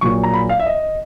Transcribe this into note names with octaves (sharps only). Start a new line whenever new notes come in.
A#1 A#2 F#3 C#6
A#5
B5
F5
E5
D#5